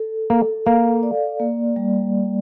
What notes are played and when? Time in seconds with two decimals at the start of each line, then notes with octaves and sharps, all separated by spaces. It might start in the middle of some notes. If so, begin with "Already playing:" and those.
Already playing: A4
0.30 A#3 A4
0.66 A#3 F5
1.03 D5
1.40 A#3
1.76 G3